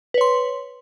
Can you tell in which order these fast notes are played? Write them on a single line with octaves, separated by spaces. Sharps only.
B4 C#5 C6